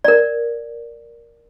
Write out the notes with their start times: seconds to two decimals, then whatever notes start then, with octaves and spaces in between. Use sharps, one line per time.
0.04 A#4 D5